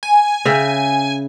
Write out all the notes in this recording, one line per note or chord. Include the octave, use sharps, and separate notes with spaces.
G#5
C#3 E5 G5